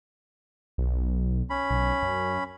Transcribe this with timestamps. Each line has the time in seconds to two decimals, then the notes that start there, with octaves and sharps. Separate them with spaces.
0.78 B1
1.50 C#4 B5
1.70 B1
2.03 F#2